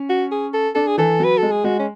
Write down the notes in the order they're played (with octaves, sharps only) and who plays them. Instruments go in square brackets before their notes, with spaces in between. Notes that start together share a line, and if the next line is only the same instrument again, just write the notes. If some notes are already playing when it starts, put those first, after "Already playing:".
Already playing: [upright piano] C#4
[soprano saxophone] F#4
G#4
A4
[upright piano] D4 [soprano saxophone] A4
[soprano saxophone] G#4
[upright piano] E3 [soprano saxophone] A4
[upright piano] F#3 [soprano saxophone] B4
[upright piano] G#3 [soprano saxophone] A4
[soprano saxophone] G#4
[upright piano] G#3 [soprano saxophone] F#4
[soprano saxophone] C#4